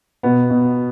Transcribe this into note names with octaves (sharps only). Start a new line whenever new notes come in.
B2 B3
B2